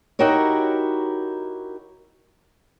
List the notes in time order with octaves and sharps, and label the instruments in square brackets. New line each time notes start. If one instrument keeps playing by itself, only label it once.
[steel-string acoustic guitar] D#4 E4 F#4 G4 A#4 C#5